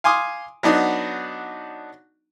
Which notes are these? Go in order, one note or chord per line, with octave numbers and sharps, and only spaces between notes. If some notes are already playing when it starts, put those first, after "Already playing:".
F5 G#5 C6 D6 D#6
F#3 B3 D4 D#4